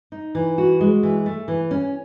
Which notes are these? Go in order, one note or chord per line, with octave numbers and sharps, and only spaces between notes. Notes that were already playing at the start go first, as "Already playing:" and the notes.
D#4
E3
F#4
G#3
E3
A3
E3
C#4